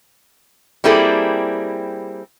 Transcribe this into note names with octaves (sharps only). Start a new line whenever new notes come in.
G3 A#3 C4 E4 G#4 A4